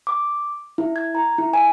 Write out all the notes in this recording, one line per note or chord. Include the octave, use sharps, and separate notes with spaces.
D6
E4
G#6
A#5
E4
G#5